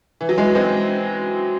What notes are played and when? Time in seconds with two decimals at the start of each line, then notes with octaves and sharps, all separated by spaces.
0.21 E3
0.29 F#3
0.38 E3 G#3
0.55 G#3 C4